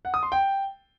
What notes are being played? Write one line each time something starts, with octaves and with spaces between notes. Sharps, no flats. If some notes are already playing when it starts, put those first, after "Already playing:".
F#5
D#6
C6
G5